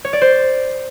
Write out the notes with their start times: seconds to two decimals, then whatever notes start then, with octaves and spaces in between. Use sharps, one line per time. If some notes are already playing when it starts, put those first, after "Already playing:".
0.05 C#5
0.13 D5
0.21 C5